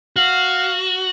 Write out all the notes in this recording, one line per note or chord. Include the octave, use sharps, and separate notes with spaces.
F#4 F5